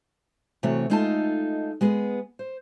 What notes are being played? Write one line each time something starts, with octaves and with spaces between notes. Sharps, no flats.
C3 E3 A3 F#4 C#5
G#3 A3 D#4 F4 A4 A5
G#3 B3 G#4
C5